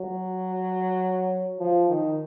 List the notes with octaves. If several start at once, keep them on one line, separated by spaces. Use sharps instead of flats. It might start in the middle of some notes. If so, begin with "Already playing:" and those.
Already playing: F#3
F3
D#3